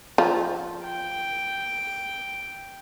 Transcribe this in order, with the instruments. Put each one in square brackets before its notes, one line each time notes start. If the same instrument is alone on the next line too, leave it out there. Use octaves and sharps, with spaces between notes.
[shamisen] F3
[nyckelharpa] G5